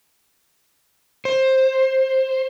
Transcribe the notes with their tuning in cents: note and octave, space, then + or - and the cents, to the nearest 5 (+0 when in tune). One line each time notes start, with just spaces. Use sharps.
C5 +15